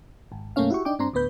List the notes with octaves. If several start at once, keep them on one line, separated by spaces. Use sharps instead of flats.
G#1
F#2 B2 A3 A#3 C#4 F5
E4 F#4 G4 C#6
D4 D#4 G5 D6
G2 C4 D4 A#5 C6
D2 A2 B3 B4 G6